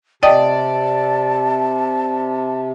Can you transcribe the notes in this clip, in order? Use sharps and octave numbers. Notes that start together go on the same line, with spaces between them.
C3 D5 D#5 G5 A5 D#6